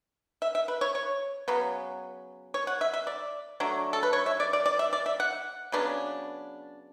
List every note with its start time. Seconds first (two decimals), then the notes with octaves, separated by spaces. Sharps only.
0.42 E5
0.55 E5
0.68 B4
0.81 C#5
0.95 C#5
1.48 C#3 F#3 B3
2.54 C#5
2.67 F#5
2.81 E5
2.94 E5
3.07 D5
3.60 F#3 A3 D4
3.93 A4
4.03 B4
4.13 C#5
4.26 E5
4.40 D5
4.53 D5
4.66 D5
4.79 E5
4.93 D5
5.06 E5
5.20 F#5
5.72 C#3 F#3 B3 D4